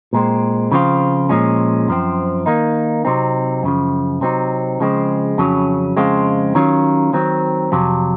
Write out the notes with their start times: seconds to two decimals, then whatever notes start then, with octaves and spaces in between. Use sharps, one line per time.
0.13 A#2 G#3 C4
0.72 C#3 F3 C4 F4
1.29 A#2 F3 G#3 C#4
1.88 F#2 F3 C4
2.46 D#3 A#3 D#4
3.05 C3 F#3 C4 D#4
3.63 F#2 C#3 F3
4.21 C3 F#3 C4 D#4
4.80 C#3 F3 G#3 C4
5.38 F2 C#3 F#3 C#4
5.97 F2 C#3 G#3 C4 F4
6.55 D#3 F#3 C#4 F4
7.13 D#3 F#3 C4
7.72 F2 C3 F#3